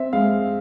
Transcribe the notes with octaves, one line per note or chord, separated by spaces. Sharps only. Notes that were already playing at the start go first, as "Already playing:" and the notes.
Already playing: C4 E5
G#3 F5